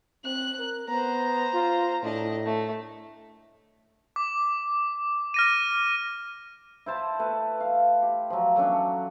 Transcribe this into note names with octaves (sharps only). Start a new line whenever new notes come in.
C4 F#6
A#4
B3 C5 A#5
F4
A2 D4 D#5
A3
D6
F6 A#6 D#7
E4 C5 A5 B5
A3 B4
F5
G4
F3 F#3
F#3 A3 C#4 D4